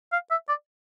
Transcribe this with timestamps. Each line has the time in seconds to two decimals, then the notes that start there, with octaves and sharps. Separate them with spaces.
0.12 F5
0.31 E5
0.49 D5